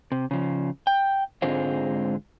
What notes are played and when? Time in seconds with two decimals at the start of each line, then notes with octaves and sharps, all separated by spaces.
0.12 C3
0.31 C#3 F3
0.87 G5
1.42 G#2 D3 G#3 C4 F4